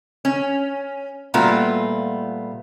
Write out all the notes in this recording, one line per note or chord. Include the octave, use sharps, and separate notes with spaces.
C#4
A#2 G3 A3 B3 F4 F#4